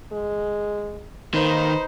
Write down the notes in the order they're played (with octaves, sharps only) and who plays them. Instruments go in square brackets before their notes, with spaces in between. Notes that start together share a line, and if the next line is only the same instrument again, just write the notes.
[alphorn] G#3
[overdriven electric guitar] D#3 [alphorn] A#3 [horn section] D#4 B4 C5